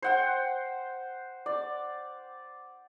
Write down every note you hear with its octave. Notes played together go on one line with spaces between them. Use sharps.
C5 F#5 G5
D5